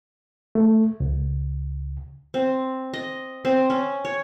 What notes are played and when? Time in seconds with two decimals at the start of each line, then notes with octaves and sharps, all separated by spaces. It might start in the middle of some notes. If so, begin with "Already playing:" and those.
0.55 A3
1.00 C#2
2.34 C4
2.93 D#5
3.45 C4
3.70 C#4
4.05 C#5